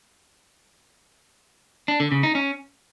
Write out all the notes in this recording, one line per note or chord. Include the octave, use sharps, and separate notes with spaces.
D4
D3
C#3
D#4
C#4